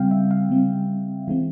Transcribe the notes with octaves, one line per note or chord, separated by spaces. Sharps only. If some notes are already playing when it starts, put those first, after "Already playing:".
Already playing: C#3 G3 C4 F5 G5
E5
F5
C#3 G3 C4
E3 G#3 C4